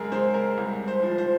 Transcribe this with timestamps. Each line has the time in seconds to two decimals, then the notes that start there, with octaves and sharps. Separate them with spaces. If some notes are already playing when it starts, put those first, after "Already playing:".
Already playing: F#2 G#3 G#4 A#4
0.12 G#3 C5
0.34 A#4
0.58 C2
0.88 C5
1.03 F3
1.18 C5